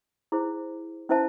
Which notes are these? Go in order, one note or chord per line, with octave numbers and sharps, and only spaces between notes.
E4 G#4 C5
C#4 E4 C5 E5 A5